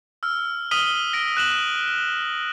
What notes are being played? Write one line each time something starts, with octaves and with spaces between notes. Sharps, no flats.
E6 F6
D#6 F6 B6 D#7 F#7 G7
A#6 D7
F#6 E7 F#7